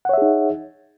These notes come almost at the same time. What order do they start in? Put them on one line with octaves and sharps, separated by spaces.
F#5 C#5 E5 G#4 D#4